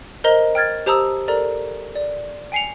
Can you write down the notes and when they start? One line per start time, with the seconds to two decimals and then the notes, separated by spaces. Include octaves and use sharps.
0.24 A#4 C5 D#5 A#5 G7
0.55 G5 F6 G#6 A6
0.86 G4 C5 A5 A#5 D#6 E6
1.28 A4 A#4 D5 A#5
1.96 D5
2.52 G5 G#5 C7 C#7 F7